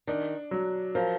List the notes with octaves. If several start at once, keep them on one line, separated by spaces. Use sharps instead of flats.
D#3 D4
F#3
F3 A#4